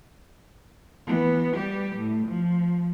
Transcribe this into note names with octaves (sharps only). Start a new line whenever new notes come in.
E3 B3
G3 G4
A2
F3